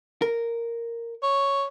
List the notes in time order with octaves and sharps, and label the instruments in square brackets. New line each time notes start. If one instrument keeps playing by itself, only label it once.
[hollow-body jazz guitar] A#4
[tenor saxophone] C#5